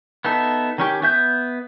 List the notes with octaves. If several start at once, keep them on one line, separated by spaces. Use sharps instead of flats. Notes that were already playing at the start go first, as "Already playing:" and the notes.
B3 D#4 A4 E5
D#3 C#4 G4
B3 E5 G6